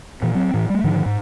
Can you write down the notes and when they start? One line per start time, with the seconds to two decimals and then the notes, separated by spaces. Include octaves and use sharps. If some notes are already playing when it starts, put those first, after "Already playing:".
0.22 A#2 E3
0.35 F#3 C4
0.54 A2 E3
0.70 G3 A3
0.84 G#2 D3 D#3 F3
1.06 G#2